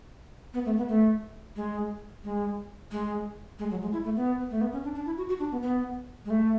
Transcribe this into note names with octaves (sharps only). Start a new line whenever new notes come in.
B3
A3
B3
A3
G#3
G#3
G#3
G#3
F#3
G#3
E4
A3
B3
A3
B3
C#4
D4
D4
E4
F#4
F#4
D4
B3
B3
G#3
A3